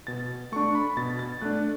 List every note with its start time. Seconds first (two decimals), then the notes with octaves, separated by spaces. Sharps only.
0.07 B2 A6
0.52 A3 D4 C#6
0.75 B5
0.97 B2 A6
1.19 A6
1.42 A3 D4 F#6